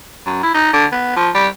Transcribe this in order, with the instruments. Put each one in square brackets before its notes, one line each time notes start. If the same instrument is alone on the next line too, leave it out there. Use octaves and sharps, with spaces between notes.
[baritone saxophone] F#2
E4
D#4
D3
B3
F3
G3